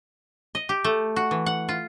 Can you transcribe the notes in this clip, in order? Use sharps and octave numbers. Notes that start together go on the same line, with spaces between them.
D#5
G4
A3
F#4
E3
F#5
F4